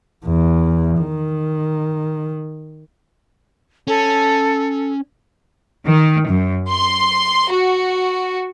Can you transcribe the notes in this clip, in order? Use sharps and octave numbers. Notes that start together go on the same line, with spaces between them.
E2
D#3
C#4 A4
D#3
F#2
C6
F#4